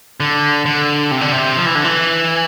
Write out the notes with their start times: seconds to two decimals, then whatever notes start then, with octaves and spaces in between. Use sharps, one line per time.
0.20 D3
0.66 D3
1.11 C3
1.21 D3
1.32 C3
1.57 F3
1.66 E3
1.75 D3
1.84 E3